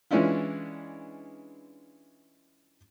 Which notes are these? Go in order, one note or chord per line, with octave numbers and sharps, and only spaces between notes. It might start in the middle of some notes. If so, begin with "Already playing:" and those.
E3 G#3 C#4 D4 E4 F4